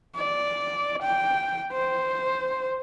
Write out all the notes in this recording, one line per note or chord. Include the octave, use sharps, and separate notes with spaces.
D5
G5
C5